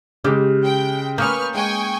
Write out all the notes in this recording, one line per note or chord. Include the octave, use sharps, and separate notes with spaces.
C#3 G#3 G4
G5
A#3 C#4 B4 C#6 D#6 F6 G6
G#3 G5 G#5 C#6